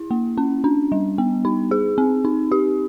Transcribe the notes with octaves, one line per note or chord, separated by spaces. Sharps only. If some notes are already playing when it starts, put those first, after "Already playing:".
Already playing: E4
A#3
C#4
D4
G3
B3
D#4
G#4
C4
D#4
G4